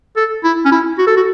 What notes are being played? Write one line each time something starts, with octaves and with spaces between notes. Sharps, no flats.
A4
E4
C#4
E4
F#4
A4
F#4